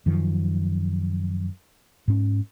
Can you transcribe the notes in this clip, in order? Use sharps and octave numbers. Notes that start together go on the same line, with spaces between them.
F#2 D#3 F3
G#2 C#4